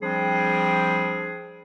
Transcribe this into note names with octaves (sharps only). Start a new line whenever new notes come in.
F3 G3 C4 D4 G#4